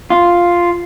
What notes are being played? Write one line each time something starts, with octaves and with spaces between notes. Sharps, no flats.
F4